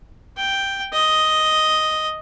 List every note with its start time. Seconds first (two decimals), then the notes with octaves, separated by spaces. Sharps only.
0.37 G5
0.93 D#5